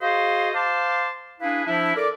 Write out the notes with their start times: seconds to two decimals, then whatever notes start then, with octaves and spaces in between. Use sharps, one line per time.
0.01 F#4 G#4 C5 D#5 F5
0.54 C5 F5 A5 C6 D6
1.41 D4 E4 G#4 B4 F5
1.66 F3 D4 E4
1.96 A4 A#4 D5